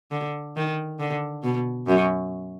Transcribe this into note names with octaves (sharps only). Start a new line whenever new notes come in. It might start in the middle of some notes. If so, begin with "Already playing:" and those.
D3
D#3
D3
B2
F#2